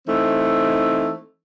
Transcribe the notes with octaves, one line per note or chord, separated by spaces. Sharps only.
E3 A3 C4 D#4